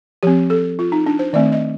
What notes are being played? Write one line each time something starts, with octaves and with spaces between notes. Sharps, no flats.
F3 C4 G4
A4
F4
D#4
D4
C5
D#3 A3 C4 D5
D#5